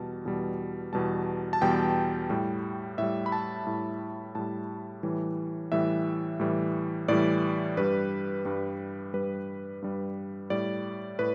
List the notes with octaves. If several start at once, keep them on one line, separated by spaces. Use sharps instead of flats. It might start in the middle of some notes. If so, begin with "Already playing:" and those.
Already playing: E2 B2 G3 A5
E2 B2 G3
E2 B2 G3 A5
A5
E2 B2 G3 G5
A2 G3
A2 G3 E5
B5
A5
A2 G3
A2 G3 A5
A2 E3 G3
A2 E3 G3 E5
A2 E3 G3
A2 E3 G3 D5
G2 G3 B4
G2 G3
G2 G3 B4
G2 G3
A2 G3 D5
A2 B4